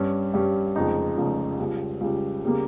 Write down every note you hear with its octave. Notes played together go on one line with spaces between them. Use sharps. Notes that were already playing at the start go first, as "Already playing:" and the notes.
Already playing: G2 G3 C#4
G2 G3 C#4
F1 F2 C#3 G#3 D#4
F1 F2 C#3 G#3 D#4
C#2 C#3 G3
C#2 C#3 G3
C#3 G3 A#3